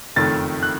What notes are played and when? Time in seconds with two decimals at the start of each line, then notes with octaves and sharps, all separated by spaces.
0.16 F#1 F2 D#3 A3 A6
0.63 F#6